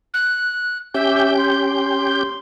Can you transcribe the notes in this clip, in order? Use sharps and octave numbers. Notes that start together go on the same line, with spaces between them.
F#6
C#4 G4 E5 G6
C6